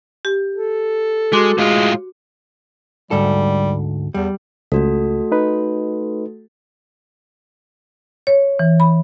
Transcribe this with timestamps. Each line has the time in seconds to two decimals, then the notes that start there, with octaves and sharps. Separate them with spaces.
0.25 G4
0.55 A4
1.33 G#3 F#4 C6 D6
1.58 A2 G#3 F4
3.11 D2 G#2 G3 A4
4.14 E2 G3
4.72 C#2 A3 F#4 A4
5.32 D#4 B4
8.27 C#5
8.59 E3
8.80 B5